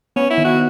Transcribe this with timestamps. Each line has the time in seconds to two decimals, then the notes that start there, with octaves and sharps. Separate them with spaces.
0.16 B3 C#4
0.30 E4
0.38 D#3
0.45 F#4